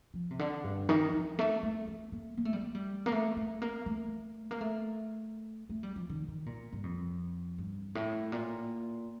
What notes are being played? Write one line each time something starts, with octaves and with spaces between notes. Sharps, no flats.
F3
C3
D3
G2
D#3
F3
A3
A3
A3
A#3
A#3
A3
G3
A3
G3
A#3
A3
A3
A#3
A3
A#3
A3
A3
G3
F3
D#3
D#3
A#2
G2
F2
G2
A2
A#2